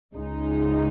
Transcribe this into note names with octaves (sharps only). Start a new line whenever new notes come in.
C#2 C#3 G#3 D#4